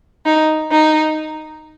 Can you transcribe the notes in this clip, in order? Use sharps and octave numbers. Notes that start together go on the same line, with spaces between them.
D#4
D#4